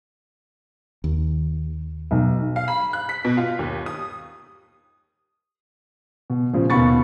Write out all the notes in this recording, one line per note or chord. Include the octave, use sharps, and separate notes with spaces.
D#2
B1
F5
B5
F#6
B6
B2
F4
D#2
D#6
B2
A#2 C#3 F3
D#2 B2 F5 B5 C#6 A6